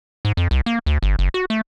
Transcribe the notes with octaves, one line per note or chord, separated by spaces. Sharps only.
G#2
F2
C2
A#3
D2
G1
F#1
F#4
A3